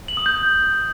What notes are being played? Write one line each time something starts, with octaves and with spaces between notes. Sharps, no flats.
F#7
D#6
G6